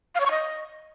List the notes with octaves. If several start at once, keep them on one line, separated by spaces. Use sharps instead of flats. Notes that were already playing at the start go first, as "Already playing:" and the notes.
F5
C#5
C#6
D#5